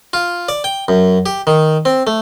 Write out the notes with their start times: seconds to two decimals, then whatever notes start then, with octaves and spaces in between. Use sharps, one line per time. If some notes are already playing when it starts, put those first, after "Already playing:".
0.13 F4
0.49 D5
0.64 G5
0.88 F#2
1.26 G4
1.47 D#3
1.85 C4
2.07 A3